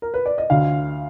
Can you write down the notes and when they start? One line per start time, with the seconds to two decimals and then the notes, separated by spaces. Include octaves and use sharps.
0.02 A#4
0.14 B4
0.26 D5
0.38 D#5
0.50 D2 D3 F5